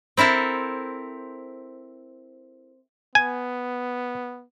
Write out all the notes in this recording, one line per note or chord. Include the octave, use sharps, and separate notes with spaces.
C4 E4 A4 A#4 C5
B3 G#5